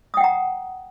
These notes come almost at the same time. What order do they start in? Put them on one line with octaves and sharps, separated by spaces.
D#6 G5 F#5 A#5